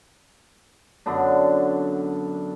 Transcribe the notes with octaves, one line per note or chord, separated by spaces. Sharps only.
F#2 D3 B3 D4